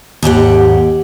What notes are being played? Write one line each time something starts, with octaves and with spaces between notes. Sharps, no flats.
D#2 G#2 G4 F#5